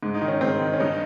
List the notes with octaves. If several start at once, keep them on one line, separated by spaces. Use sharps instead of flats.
G#2
D#4
D#3
C#4
G#2 C4
D#3
C#4
G2 D#4